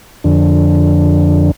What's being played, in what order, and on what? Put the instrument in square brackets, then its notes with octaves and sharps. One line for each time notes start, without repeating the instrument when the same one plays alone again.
[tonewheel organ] F2 D3